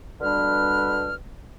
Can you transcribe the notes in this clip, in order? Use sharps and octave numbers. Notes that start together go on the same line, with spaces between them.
B2 D3 G3 D4 B4 F6